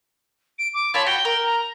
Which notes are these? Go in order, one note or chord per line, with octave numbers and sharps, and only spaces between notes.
D7
D6
F4 C#5 A5 B5
F#4 G5
A#4
A#5